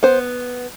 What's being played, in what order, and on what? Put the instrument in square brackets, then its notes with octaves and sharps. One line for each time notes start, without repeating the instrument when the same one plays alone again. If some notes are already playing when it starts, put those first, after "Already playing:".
[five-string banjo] B3 C5